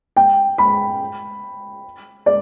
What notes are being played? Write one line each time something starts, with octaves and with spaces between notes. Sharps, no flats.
G5
B5
D5